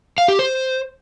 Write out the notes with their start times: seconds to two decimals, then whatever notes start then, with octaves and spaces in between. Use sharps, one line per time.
0.18 F5
0.28 G4
0.39 C5